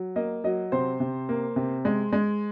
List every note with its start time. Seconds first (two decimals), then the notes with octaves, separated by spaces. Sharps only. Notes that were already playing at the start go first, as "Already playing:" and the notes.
Already playing: F#3
0.16 A#3 D#5
0.44 F#3 D#5
0.72 C3 C5
1.00 C3
1.29 A#3
1.56 C3
1.85 G#3
2.13 G#3